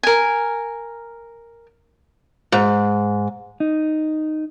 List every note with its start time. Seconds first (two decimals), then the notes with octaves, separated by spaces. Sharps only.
0.03 A#4 G#5
2.52 G#2
3.60 D#4